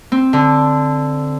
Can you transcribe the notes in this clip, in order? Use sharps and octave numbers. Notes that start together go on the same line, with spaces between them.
C4
D3